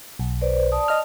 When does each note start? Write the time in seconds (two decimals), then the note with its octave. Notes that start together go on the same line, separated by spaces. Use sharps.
0.19 B1
0.41 B4 C5 D5
0.72 D5 A5 D#6
0.88 D#5 F6